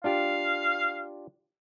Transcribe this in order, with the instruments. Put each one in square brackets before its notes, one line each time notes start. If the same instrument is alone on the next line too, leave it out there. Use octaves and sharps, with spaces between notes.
[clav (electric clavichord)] D4 F4 G4 [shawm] F5